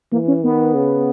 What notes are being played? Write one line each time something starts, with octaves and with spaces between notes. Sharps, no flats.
E3 A#3
C#4
D#3 B3
C#3